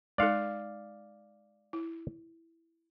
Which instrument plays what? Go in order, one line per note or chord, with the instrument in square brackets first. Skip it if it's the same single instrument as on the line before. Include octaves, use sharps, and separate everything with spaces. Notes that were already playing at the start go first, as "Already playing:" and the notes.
[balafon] G#3 D#4 A4 [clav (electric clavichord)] D5 F5
[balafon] E4